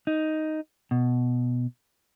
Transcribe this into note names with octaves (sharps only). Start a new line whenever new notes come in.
D#4
B2